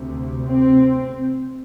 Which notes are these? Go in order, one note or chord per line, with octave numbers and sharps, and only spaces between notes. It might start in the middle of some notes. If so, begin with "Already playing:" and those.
Already playing: D2 C3
C4